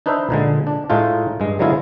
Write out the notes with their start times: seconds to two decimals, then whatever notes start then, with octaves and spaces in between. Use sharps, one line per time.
0.06 D4 D#4 B4 C5 E5
0.30 A#2 D3 G#3
0.67 D4
0.90 A2 G#3 A3 D#4 F4
1.40 G2 G#3
1.59 D3 F#3 G#3 B3 E4 F4